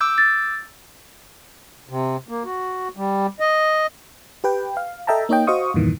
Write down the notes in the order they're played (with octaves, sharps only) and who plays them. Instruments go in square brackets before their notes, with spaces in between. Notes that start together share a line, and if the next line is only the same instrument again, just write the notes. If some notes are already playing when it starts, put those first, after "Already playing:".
[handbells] D6 E6 G6
[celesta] A6
[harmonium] C3
A#3
F#4
G3
D#5
[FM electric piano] G4 B4 G5
F5
A4 D#5 E5 G5 A5 A#5
A#3 D#4 C#5 D#5 G5
F#4 C5 D#5 F5 C#6 D#6
E2 G2 A#2 D#3 E3